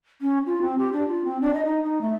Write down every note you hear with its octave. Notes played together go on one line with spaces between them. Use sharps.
C#4
F4
C4
G4
D4
F4
C4
D4
D#5
D#4
D#4
A3